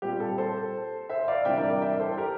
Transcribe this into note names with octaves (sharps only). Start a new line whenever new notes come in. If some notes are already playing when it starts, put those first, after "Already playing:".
A#2 G3 C4 G4
A4
A4 C5
C5 E5
D5 F5
C3 E3 G3 D4 E5 G5
A#4 D5
A#4 D5
E5 G5
A4 C5
G4 A#4